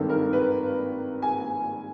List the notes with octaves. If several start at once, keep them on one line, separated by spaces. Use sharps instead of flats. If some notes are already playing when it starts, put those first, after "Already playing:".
Already playing: G#1 G2 D#3 A4
A#4
B4
G#5